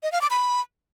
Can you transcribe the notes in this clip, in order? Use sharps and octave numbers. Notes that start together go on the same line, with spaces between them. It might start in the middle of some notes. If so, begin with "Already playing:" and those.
D#5
F5
D6
B5